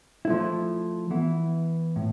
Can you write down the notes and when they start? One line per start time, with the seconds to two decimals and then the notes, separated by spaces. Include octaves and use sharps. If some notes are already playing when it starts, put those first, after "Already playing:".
0.25 F3 A3 E4
1.11 E3 B3 E4
1.96 A2